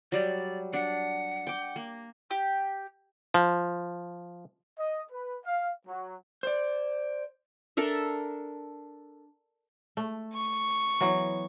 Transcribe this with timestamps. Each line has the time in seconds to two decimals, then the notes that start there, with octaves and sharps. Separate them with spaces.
0.12 F#3 G3 D5
0.73 D4 F#5
1.47 G5 D6
1.76 A#3
2.31 G4
3.34 F3
4.79 D#5
5.11 B4
5.45 F5
5.87 F#3
6.43 C5 D5
7.77 D4 A4 A#4 E5
9.97 A3
10.34 C#6
11.00 E3 F#3 B3